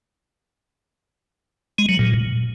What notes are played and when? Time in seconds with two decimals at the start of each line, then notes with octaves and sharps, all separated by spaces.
1.78 G#3
1.89 F#3
1.99 A#2